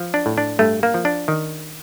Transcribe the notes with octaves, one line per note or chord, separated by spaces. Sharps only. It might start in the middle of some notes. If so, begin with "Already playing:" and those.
Already playing: F3
D4
A2
D4
G2 A3
A#3
F3
D4
D#3